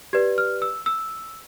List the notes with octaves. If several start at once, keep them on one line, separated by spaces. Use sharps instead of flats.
G4 B4 D5 G#6
F6
E6
E6